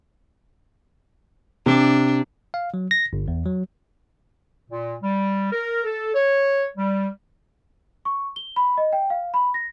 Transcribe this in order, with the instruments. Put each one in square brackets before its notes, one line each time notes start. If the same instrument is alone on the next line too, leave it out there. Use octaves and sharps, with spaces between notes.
[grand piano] C3 [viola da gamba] D4
[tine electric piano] F5
F#3
A#6
G1
E2
F#3
[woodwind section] A#2
G3
A#4
A4
C#5
G3
[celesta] C#6
G7
B5
D#5
G5
F5
B5
A#6